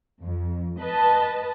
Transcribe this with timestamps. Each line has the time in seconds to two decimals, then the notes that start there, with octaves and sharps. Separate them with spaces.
0.22 F2
0.79 B4 D#5 A5